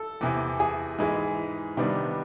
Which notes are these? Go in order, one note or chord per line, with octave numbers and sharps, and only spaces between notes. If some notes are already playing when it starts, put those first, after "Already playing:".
Already playing: A4
E2 C3 E3
G#4
G#2 E3 G#3
C3 D#3 G3 B3 D4